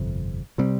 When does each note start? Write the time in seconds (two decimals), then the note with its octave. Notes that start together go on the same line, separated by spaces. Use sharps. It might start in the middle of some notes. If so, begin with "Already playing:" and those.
Already playing: G1 F2 C3
0.58 C3 G3 C4